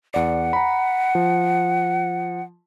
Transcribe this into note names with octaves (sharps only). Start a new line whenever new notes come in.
E2 D5 F#5
A#5 B5
F3